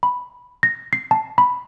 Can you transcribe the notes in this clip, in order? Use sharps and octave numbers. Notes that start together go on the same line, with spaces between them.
B5
A#6
C7
A5
B5